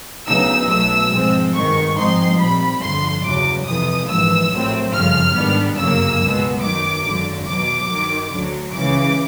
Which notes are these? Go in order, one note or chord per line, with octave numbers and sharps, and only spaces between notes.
D2 C#3 F#3 B3 D#4 E6
B1 B2 F#3 A3 E6
G#2 F3 G#3 C4
G#1 G2 D#3 G#3 C#6
G#2 F3 G#3 C4 D#4 C6
A#2 G3 C4 B5
G1 F2 D3 F3 C6
E2 C#3 F#3 D6
F2 C3 E3 D#6
A#1 G#2 E3 E6
A#1 A2 F#3 A3 C4
G1 F#2 C#3 F3 F6
G#2 D#3 G3 B3 D4
G1 F#2 C#3 F#3 A#3 E6
C#2 B2 G#3 B3
F#2 D#3 F#3 D6
G#1 F#2 D3 F#3
E2 B2 F#3 D6
G2 D#3 F#3
D2 D3 F#3
C#2 C#3 E3 D6